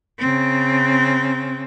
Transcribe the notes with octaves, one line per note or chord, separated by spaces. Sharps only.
C#3 C4